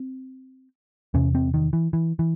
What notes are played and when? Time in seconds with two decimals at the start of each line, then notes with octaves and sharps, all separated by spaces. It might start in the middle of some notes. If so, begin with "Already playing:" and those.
Already playing: C4
1.14 E2 C3 C#4
1.35 C4
1.54 D#3
1.73 E3
1.93 E3
2.19 E3